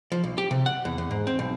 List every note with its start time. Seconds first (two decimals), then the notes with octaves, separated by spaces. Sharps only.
0.12 F3
0.24 B1
0.38 G4
0.51 C3
0.66 F#5
0.85 E2
0.98 E2
1.11 G#2
1.27 C4
1.39 B1